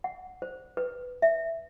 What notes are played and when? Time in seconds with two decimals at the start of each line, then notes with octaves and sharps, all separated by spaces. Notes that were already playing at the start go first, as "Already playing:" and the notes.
0.04 F#5
0.42 C5
0.77 B4
1.22 E5